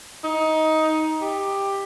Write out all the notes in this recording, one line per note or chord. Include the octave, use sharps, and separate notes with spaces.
D#4
G4